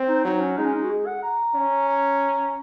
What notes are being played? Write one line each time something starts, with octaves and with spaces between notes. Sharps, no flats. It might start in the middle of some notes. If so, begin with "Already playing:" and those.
Already playing: C4
D#4
F#3 D#4
C#4
G#3 D#4
C#4
D#4
F#4
G#4
F#5
A#5
C#4
A#5